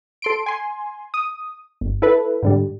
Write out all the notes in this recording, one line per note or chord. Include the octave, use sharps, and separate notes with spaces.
A4 C6 D7
G#5 C6
D#6
G1
E4 A4 B4
G#2 D3 G3